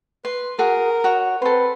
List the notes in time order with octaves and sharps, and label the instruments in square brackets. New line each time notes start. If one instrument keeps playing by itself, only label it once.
[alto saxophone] B4 [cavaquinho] C6
[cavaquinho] F#4 G#4 [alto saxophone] A#4
[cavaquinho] F#4 C#5
[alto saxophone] C4 [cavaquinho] A4 C6 [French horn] B4